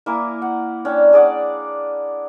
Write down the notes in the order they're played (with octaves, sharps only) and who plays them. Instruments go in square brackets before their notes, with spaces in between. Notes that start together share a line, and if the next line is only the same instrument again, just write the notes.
[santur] A#3 E4 A#4 G#5
F#5
C#4 D4 G5
G#4 D5 F#5